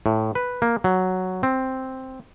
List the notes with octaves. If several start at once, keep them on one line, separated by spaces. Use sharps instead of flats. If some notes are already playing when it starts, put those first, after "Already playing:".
A2
B4
A#3
F#3
C4